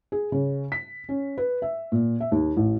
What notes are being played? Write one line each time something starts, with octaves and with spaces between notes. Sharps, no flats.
G#4
C#3
B6
C#4
B4
E5
A#2
E5
D#2
A1